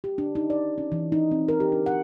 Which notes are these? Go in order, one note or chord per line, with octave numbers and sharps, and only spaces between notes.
G4
D4
D#4
D5
C#4
E3
D#4
C4
A#4
G4
D4
F#5